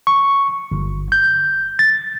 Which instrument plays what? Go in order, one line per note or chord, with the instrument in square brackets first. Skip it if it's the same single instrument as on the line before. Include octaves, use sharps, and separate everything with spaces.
[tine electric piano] C#6
G1
G6
A6